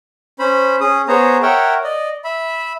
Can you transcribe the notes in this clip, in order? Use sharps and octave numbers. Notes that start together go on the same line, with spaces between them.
C#4 C5 B5
C#4 G#4 D#6
B3 G#4 C5 C#5 A#5
A#4 C#5 E5 F#5 G5
D5 D#5
E5 B5